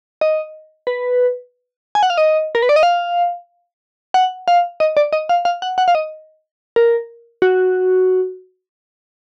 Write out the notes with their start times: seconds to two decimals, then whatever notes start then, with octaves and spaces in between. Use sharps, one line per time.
0.21 D#5
0.87 B4
1.95 G#5
2.03 F#5
2.10 F5
2.18 D#5
2.55 A#4
2.62 B4
2.69 D5
2.76 D#5
2.83 F5
4.14 F#5
4.48 F5
4.80 D#5
4.97 D5
5.13 D#5
5.29 F5
5.45 F5
5.62 F#5
5.78 F#5
5.88 F5
5.95 D#5
6.76 A#4
7.42 F#4